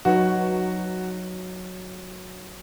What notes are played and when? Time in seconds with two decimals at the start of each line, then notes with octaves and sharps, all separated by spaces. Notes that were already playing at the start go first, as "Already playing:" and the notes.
0.05 F#3 D#4 F#4 B4